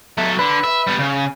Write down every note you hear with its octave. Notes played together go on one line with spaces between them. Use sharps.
F#3 A4 E5
D3 B4
E5
G3 B3
C#3